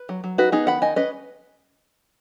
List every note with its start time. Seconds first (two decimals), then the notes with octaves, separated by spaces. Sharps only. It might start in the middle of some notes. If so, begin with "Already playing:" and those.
Already playing: B4
0.09 F#3
0.24 F#3
0.38 D#4 F#4 B4
0.52 B3 D#4 G#4
0.67 D#3 F#5 B5
0.82 D#3 D#5 G#5
0.96 C#4 B4 D#5